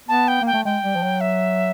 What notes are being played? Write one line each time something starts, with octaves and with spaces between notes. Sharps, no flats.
B3 A5
G5
A#3 G5
A3
G#3 G5
G3
F3
F#3
E5